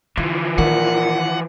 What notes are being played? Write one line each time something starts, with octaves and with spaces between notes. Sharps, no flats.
D3 E3 F3
A#2 D#3 F#5